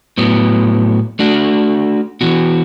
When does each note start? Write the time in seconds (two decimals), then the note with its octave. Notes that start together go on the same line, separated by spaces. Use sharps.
0.18 A2 F#3 B3
1.19 A3 D4 F#4
2.21 E3 B3 F#4